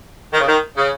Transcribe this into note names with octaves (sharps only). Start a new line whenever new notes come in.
D#3
C#3
D#3
C#3